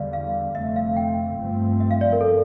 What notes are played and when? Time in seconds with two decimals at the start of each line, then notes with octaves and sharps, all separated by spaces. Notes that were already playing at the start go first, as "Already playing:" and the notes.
Already playing: E2 D3 G3 D5 F5
0.13 F5
0.55 F1 F2 D3 A3 C4 E5
0.76 F5
0.97 G5
1.38 G1 G2 F3 A3 C4
1.80 E5
1.91 F5
2.01 D5
2.12 A#4
2.21 A4